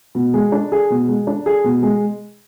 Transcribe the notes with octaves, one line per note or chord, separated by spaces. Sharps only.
B2
G#3
D4
G#4
B2
G#3
D4
G#4
B2
G#3